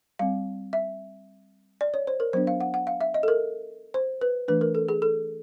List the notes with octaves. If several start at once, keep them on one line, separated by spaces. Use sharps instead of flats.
G3 C4 F5
E5
D5
C#5
C5
A#4
F#3 B3 D4 C5
F5
F#5
F#5
F5
E5
D#5
A4
A#4
C5
B4
E3 A3 D4 B4
A#4
A4
G#4
A4